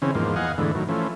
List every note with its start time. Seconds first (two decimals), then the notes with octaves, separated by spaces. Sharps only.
0.02 C#3 E3 C4 C#4
0.15 E2 G#2 F3 A#3
0.36 E2 D#5 F5 F#5 G#5
0.58 E2 G#2 D3 E3 A3
0.75 A2 D#3 F#3
0.89 E3 F3 A3 C#4